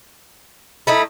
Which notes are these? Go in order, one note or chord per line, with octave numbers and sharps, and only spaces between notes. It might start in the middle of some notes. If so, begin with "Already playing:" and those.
A3 D#4 E4 B5